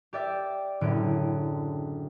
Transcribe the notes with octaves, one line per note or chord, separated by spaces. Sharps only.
G4 D5 E5
F#1 A2 D3 C#4 D7